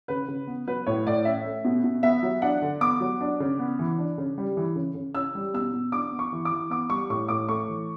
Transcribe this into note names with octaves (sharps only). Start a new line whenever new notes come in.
C#3 B4
C#3
B3
F#3 B4
A2 C#5
A2 D5
C#4 E5
A3
B2
B2
B3 E5
F#3
D4 F#5
D3
B3 D6
F#3
D4
C#3
B3
E3
D4
C#3
G3
E3
C#3
C#3
C#4 E6
G3
B2 E6
B2
D4 D6
B3
C#6
E3
D6
E3
B3 D6
G3 C#6
A2 C#6
A2 D6
A3 C#6
E3